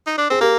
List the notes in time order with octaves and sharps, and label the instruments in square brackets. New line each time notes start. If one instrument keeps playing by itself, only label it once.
[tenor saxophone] D#4
D4
[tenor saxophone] C4 [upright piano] G#4
[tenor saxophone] A#3 [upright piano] G4 A#4